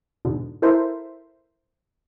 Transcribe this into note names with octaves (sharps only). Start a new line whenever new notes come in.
E2 G#2 B2 D3
E4 A4 A#4 C5 E5